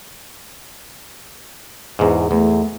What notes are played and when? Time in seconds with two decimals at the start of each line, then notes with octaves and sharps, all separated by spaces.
1.99 E2 G#2
2.31 E2 A3